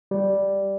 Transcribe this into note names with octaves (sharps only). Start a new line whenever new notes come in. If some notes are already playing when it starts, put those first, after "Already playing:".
G3